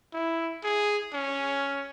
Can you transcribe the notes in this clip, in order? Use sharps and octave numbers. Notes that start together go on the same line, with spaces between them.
E4
G#4
C#4